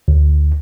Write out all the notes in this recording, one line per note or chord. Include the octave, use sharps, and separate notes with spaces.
D2